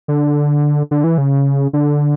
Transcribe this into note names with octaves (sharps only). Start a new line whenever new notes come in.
D3
D3
E3
C#3
D3